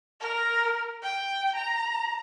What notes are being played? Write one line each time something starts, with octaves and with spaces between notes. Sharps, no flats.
A#4
G5
A#5